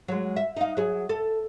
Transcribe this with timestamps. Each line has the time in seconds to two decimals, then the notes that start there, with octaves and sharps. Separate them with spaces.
0.08 F#3 G#3
0.36 E5
0.57 D#4 F5
0.77 F#3 G#4
1.09 A4